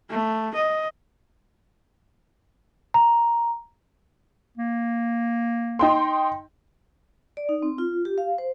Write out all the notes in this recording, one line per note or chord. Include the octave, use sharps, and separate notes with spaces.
A3
D#5
A#5
A#3
D#4 G5 C6
D5
D#4
C4
F4
G4
F5
C5